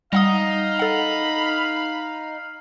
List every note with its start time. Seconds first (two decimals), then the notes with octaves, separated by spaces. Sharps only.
0.13 G3 D#4 F5 F#5 D#6
0.79 A4 F#5 B5